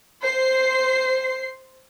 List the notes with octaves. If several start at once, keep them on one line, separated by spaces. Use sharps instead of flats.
C5 C7